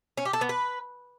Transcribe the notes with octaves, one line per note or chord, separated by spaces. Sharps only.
C#4
G4
A4
B3
B4